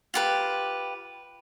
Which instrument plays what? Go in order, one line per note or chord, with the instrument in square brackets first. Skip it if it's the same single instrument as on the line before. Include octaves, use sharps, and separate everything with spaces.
[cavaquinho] F4 G4 B4